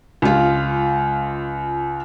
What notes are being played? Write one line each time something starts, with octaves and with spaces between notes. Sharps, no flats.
C#2 F4